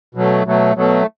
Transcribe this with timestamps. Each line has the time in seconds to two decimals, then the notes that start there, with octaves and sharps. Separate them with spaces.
0.15 B2 F#3 A3
0.45 B2 F#3 A3
0.76 B2 F#3 A3